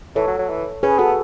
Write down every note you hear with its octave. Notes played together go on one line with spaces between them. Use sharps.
E3 A4 C#5
F#3
F#3
E3
C#4 G#4 B4
B3 F#4 A4